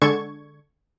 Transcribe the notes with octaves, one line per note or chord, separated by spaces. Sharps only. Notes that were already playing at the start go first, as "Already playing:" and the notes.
D3 G#3 D4 A4 C#6 G#6